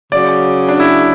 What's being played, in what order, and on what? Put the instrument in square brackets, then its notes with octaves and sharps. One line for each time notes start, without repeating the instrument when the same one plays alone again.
[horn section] C#3 F#3 C#4 [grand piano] D5
[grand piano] D4
E4